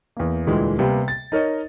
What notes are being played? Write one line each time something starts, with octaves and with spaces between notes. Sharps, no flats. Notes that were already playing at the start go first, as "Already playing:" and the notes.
E2 A#3
D2 A#2 E3 G3 G#3
C3 G3 A#3 B3
A6
D#4 A#4 C#5 D#5